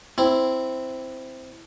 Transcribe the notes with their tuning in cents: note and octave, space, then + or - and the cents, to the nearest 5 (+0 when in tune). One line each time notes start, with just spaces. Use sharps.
C4 -5 E4 +0